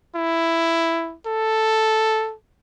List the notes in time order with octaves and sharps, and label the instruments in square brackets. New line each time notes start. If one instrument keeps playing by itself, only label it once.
[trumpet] E4
A4